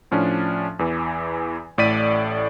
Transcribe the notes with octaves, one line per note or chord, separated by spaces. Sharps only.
A2 F3 C#4 D4
E2 E3
A1 A2 A4 D5 B6 D#7